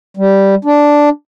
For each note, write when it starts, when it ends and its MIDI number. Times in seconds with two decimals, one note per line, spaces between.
0.17 0.55 55
0.65 1.09 62